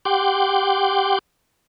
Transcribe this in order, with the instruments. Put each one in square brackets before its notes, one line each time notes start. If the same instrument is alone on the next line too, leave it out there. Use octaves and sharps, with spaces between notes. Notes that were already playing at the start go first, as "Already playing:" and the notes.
[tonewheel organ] G4 F#5 G5 C6 D6